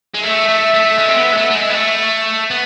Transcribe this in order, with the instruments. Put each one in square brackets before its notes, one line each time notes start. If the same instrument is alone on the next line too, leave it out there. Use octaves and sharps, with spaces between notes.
[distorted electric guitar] G#3
[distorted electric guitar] A3 [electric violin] E5
[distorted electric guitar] A3
A3
G#3
C4
B3
G#3
A3
A3
G#3
B3
A3
B3